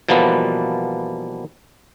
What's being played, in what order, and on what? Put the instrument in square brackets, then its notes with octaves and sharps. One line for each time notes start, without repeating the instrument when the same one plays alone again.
[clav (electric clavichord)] B2 E3 F3 G3 A#3 B3